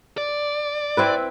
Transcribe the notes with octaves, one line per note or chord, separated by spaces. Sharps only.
D5
C4 E4 B4